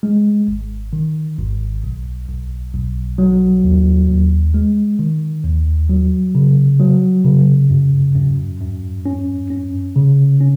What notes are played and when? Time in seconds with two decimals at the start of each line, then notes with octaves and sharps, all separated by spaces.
0.03 G#3
0.48 G#1
0.93 D#3
1.38 G#1
1.84 B1
2.28 B1
2.74 B1
3.18 F#3
3.64 D#2
4.09 D#2
4.54 G#3
4.99 D#3
5.44 D#2
5.89 F#3
6.35 C#3
6.80 F#3
7.25 C#3
7.70 F#2
8.15 F#2
8.60 F#2
9.06 C#4
9.50 C#4
9.96 C#3
10.41 C#4